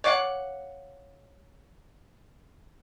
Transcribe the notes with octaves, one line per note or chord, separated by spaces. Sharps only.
C#5 D5 F5 F#5